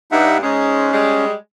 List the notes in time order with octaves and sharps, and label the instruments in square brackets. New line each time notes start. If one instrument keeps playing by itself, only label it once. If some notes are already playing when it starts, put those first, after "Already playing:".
[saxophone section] G2 [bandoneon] D#4 E5 F#5
[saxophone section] G#2 G#3 [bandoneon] C#4
[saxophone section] G3 G#3